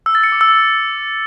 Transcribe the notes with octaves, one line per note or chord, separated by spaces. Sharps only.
E6
A6
C#7
D6
E6